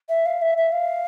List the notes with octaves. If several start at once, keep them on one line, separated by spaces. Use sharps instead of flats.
E5
F5
E5
E5
F5